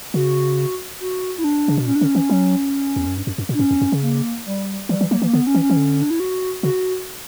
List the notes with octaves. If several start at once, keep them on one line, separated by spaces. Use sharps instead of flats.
C#3 F#4
F#4
E4
D4
C#3
B2
A#2 C#4
D4
D3
C#4
E3
F#3
E2
F#2
G2
F#2
F#2
A#2
D4
G2 C#4
E2
F#2
C#3
A#3
G3
E3 G3
E3
F#3 A#3
E3
A#3
D3 B3
C#4
E3
C#4
E3
D3
D4
E4
F#4
C#3 F#4